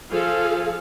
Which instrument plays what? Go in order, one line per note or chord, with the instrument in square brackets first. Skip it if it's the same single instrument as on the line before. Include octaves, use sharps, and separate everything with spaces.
[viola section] F3 G#4 A4 F5